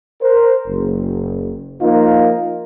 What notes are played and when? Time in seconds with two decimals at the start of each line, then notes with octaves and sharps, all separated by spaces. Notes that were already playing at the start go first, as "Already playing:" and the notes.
0.22 A#4 C5
0.67 F#1
1.81 F3 A#3 D#4 F4